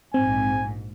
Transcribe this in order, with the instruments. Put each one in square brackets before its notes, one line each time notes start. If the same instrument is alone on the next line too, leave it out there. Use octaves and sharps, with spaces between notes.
[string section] A#1 G#2 [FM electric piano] C4 [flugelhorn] G#5